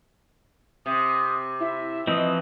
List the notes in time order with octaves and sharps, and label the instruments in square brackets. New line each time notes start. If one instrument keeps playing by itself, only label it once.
[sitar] C3 [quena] D#6
[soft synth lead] E4 [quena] E5
[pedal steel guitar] E3 F3 C4 [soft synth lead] D#5